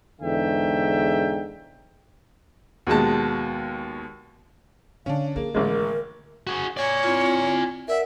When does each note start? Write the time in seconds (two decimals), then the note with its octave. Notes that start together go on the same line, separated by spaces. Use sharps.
0.21 E2 G#2 D3 E5 G5
2.87 D#2 B2 G#3 A5
5.06 D3 C#4 D4 F5
5.36 A#3 C#4 D4 G#4
5.55 A1 D3 D#3 G#3 A#4
6.47 F#4 G#4
6.77 C#5 D5 G#5
7.03 C4 E4 F4
7.88 A#4 D5 E5 F#5